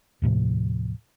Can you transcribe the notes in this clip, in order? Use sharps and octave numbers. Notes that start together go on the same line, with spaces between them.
D#2 A2 C3 F3